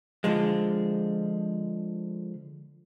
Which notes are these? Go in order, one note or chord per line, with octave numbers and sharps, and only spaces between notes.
D3 F3 G#3